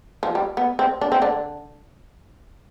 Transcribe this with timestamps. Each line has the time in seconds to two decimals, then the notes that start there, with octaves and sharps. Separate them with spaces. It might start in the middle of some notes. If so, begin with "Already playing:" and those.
0.23 F3
0.35 G3
0.57 B3
0.79 C4
1.01 D4
1.12 C4
1.22 D3 D4